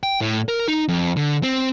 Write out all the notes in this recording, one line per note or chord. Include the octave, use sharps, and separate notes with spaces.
G5
A2
A#4
D#4
F2
D3
C4